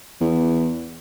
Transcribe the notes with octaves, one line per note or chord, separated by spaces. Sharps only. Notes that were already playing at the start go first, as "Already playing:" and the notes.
E2